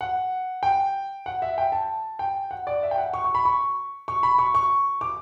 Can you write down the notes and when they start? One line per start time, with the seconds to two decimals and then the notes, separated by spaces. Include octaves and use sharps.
0.01 F#5
0.63 G5
1.26 F#5
1.42 E5
1.58 G5
1.72 A5
2.19 G5
2.51 F#5
2.67 D5
2.83 E5
2.91 G5
2.98 F#5
3.14 C#6
3.24 C#6
3.35 B5
3.45 C#6
4.08 C#6
4.23 B5
4.39 C#6
4.55 C#6
5.01 D6